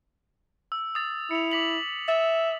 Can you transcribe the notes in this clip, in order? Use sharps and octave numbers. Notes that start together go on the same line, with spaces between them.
E6
D#6 A6
E4 C#7 F7
D6 B6 F#7
E5 A6